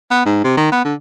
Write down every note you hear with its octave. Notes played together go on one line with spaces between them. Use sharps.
B3
G#2
C3
D#3
B3
D3